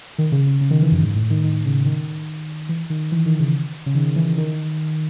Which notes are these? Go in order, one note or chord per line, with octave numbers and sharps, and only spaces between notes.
D#3
C#3
C#3
C#3
D#3
E3
F#2
G#2
A2
D#3
D#3
C#3
D#3
E3
D#3
E3
D#3
C#3
C#3
D#3
E3
D#3